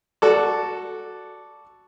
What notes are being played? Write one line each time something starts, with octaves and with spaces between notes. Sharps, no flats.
F#4 A4 D5